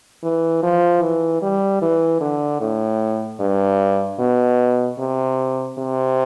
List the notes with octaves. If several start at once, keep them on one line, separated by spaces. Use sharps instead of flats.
E3
F3
E3
G3
E3
D3
A2
G2
B2
C3
C3